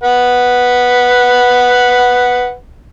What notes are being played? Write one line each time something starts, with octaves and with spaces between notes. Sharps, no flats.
B4 F#5